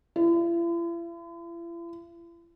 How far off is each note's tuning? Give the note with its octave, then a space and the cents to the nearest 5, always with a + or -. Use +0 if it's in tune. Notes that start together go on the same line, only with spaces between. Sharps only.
E4 +45